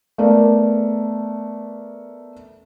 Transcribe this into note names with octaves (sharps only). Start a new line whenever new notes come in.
A3 B3 A#4 D5